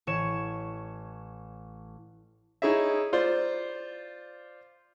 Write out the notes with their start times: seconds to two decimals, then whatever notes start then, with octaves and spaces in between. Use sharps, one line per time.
0.07 A1 C#5 E7
2.62 D#4 E4 G#4 C#5 E5
3.13 F4 C5 D5